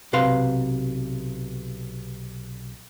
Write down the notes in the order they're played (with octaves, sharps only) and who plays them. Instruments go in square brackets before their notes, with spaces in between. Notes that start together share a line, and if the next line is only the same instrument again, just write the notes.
[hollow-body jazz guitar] B1 C3 B4 F5 C6